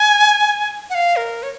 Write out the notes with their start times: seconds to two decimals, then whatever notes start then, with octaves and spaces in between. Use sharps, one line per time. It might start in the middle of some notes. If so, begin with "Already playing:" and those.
Already playing: G#5
0.90 F#5
0.95 F5
1.16 A#4
1.43 C#5